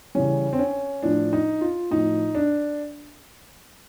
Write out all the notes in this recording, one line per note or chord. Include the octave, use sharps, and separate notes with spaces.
C#3 E3 G3 C#4
C4
C#4
A2 F3 D4
D#4
F4
A2 F3 D#4
D4